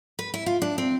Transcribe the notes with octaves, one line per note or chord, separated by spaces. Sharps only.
B4
E4
F4
D4
C4